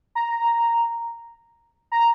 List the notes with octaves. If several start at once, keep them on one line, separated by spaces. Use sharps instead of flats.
A#5
A#5